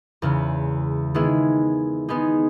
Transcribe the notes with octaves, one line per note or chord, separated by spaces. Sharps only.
E2 C#3 G#3
D#3 G#3 B3 E4 G#4
G#3 B3 D#4 G#4